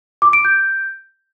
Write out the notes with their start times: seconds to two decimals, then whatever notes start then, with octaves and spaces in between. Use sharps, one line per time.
0.22 D6
0.33 D7
0.45 G6